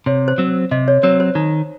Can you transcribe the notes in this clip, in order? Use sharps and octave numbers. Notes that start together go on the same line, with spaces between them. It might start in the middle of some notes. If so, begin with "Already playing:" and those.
C3 C#5
C5
F#3 C4
C3 D#5
C#5
F#3 C4 C#5
C5
D#3 D#4